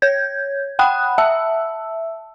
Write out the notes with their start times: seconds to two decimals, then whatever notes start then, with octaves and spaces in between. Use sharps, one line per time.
0.02 C#5 G6 G#6
0.79 F#5 G5 B5 D#6 F#6
1.18 E5 A5 E6